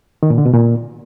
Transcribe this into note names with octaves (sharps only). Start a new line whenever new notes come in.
D#3
A#2
D3
B2
A#2